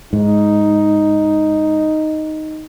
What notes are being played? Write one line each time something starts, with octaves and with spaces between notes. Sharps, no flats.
G#2 D#4